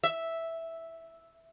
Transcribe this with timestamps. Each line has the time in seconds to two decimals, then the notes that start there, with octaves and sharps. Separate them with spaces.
0.04 E5